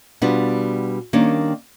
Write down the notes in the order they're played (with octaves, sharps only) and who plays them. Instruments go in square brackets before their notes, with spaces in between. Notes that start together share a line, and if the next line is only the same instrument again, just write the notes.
[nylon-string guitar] B2 G3 B3 D4 F4
D#3 G3 A#3 C#4 D4 C#5